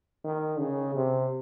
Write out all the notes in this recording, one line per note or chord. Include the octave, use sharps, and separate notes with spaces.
D#3
C#3
C3